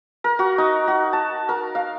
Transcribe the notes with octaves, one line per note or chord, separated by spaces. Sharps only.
A#4
F#4
D#4
F#4
A5
A#4
F5